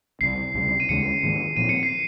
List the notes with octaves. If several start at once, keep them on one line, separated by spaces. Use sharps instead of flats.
C2 C3 G3 C7
C#2 C3 G3
D#7
D#2 C#3 G#3 C#7
G#2 D#3 A#3
A#2 F3 C4 D#7
C#7
C7